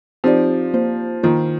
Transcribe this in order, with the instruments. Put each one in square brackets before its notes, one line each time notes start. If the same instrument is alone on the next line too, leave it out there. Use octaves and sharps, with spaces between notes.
[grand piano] F3 [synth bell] C4 D#4 G4 D5
[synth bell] A#3 F4 C5
[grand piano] D#3 [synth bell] A#3 F4 C5